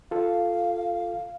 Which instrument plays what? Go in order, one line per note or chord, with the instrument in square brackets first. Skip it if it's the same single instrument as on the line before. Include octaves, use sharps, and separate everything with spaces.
[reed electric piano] F4 A4 [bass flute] F5